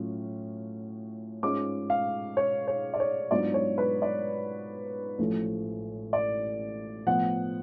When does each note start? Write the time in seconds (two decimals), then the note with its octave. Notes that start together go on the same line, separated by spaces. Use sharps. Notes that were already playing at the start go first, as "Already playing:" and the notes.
Already playing: A2 F#3 C#4 F4
1.43 G#2 G#3 C#4 F4 D6
1.90 F5
2.37 C#5
2.68 C#5
2.94 D5
3.00 C#5
3.31 G#2 F#3 B3 D4 F4 D5
3.54 C#5
3.78 B4
4.02 D5
5.18 A1 A2 F3 A3
6.13 D5
7.06 A2 F3 B3 F#5